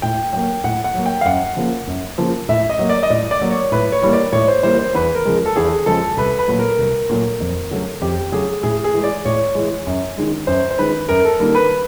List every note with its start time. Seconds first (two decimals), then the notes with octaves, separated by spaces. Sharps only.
0.02 A2 G5
0.33 F#3 A#3 G5
0.64 A2 F#5
0.84 F#5
0.95 F#3 A#3
1.06 G5
1.21 F5
1.25 F#2 F#5
1.57 C#3 F3 A#3
1.87 F#2
2.18 C#3 F3 A#3
2.49 A2 E5
2.70 D#5
2.79 F#3 A#3
2.89 D5
3.03 D#5
3.10 A2 D5
3.31 D5
3.41 F#3 A#3
3.51 C#5
3.72 A2 B4
3.92 C#5
4.02 E3 G3 A#3
4.13 D5
4.32 A2 C#5
4.48 C5
4.63 E3 G3 A#3 C5
4.79 C5
4.95 E2 B4
5.15 A#4
5.25 C#3 F3 G#3
5.46 A4
5.56 E2 G#4
5.86 C#3 F3 G#3 A4
6.17 C2 B4
6.39 B4
6.48 A#2 F#3 A3
6.59 A#4
6.79 C2
7.10 A#2 F#3 A3
7.41 F2
7.71 C#3 F#3 A3
8.02 F2 G4
8.32 C#3 F#3 A3 G#4
8.63 A2 G#4
8.84 G#4
8.94 E3 G#3
9.04 D5
9.25 A2 C#5
9.55 E3 G#3
9.87 F#2
10.18 D#3 G#3
10.47 F#2 C5
10.70 C5
10.78 D#3 G#3 B4
11.09 F#2 A#4
11.25 A4
11.40 D#3 G3 A#3 A#4
11.55 B4